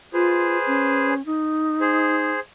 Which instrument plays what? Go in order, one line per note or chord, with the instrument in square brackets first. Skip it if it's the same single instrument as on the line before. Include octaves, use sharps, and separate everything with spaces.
[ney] F4 [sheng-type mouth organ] G#4 B4 C5
[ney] C#4
D#4
[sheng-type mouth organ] G#4 C5